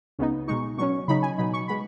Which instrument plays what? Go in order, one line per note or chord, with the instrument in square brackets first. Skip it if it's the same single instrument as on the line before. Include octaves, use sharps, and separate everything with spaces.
[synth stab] C#2 C#3 B3 D#4
B2 G#3 D#4 C#6
B2 F#3 C#4 C#6
C#3 F#3 D#4 B5
G#5
B2 F#3 D#4 B5
C#6
G#3 B3 B5